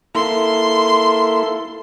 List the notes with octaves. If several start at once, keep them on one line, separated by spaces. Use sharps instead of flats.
A#3 E4 A4 C6